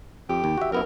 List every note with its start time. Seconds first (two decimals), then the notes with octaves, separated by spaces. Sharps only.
0.29 F2 G4
0.44 D#2
0.57 F#4 E5
0.72 F#2 B3 E4 A#4